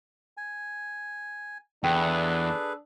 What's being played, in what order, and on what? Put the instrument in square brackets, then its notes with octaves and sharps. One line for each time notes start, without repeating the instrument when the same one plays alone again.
[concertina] G#5
[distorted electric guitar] E2 [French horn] D4 [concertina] G#4 A4 B4 [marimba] G5